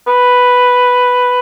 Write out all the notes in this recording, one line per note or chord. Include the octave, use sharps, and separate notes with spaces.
B4